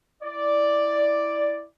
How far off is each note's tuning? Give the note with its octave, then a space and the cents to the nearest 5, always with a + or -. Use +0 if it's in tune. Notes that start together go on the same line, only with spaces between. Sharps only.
E4 +0 D5 +0